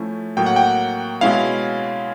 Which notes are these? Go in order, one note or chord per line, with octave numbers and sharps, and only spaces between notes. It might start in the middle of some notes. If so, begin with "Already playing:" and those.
Already playing: F3 A3 C#4 E4
A2 F#3 A#3 G5
F#5
G5
B2 G#3 C#4 E4 F5